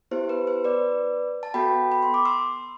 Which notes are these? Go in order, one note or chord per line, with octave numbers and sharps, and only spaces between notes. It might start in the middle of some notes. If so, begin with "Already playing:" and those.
B3 E4 G4 C5
B4
C5
B4 D5
A5
B3 F#4 A4 G5 B5
B5
C6
D6
C6 E6